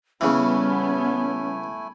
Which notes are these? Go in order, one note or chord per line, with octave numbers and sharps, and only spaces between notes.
C#3 E3 G3 A3 B3 C#4 E4 G#5